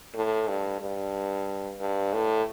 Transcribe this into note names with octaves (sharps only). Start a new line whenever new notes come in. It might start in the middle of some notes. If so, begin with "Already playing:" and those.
A2
G2
G2
G2
A2